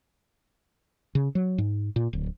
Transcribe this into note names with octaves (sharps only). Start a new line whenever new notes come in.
C#3
F#3
G#2
A#2
D1